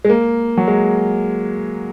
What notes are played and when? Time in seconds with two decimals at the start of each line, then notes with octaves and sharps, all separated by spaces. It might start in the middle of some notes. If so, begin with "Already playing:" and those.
0.05 G#3
0.09 A#3
0.57 F#3
0.68 G#3